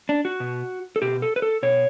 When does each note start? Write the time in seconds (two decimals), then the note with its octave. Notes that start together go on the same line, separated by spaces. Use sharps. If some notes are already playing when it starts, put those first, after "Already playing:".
0.09 D4
0.25 F#4
0.40 B2
0.96 A4
1.02 B2 G4
1.22 A4
1.36 B4
1.42 A4
1.63 B2 C#5